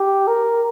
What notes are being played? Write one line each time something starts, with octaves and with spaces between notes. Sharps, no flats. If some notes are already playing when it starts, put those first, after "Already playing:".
Already playing: G4
A#4